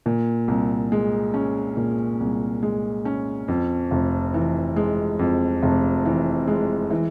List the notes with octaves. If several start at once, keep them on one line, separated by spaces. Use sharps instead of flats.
A#2
C2
G#3
C#4
A#2
C2
G#3
C#4
F2
F1
E3
G#3
F2
F1
E3
G#3
E3